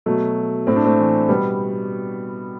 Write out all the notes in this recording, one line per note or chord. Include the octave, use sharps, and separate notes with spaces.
B2 F#3 A3
A2 C4
D4
A3 C4
E3
B2 G3 B3